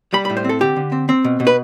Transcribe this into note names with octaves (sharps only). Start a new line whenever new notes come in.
G3 B5
B5
A2
C5
C4 A4
D3 G4
D3
C4
C4
B2
B2
B4